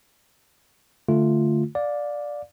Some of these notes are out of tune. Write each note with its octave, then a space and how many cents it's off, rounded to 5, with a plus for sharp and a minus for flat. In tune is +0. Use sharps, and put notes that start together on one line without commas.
D3 +0 A3 +0 F4 +0
D5 +0 F5 +30